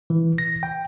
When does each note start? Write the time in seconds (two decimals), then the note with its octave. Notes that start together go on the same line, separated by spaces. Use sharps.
0.10 E3
0.38 A#6
0.63 G5